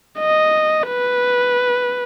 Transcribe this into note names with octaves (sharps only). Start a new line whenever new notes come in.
D#5
B4